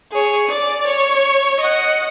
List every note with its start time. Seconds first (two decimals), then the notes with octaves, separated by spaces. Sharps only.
0.12 G#4 C#5
0.49 D5
0.87 C#5
1.60 D#5 F#5